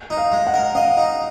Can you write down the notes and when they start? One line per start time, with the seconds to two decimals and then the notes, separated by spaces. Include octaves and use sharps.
0.10 D#4
0.17 F5
0.32 G#3
0.47 F#5
0.54 A#4
0.75 D#5 F5
0.97 D#4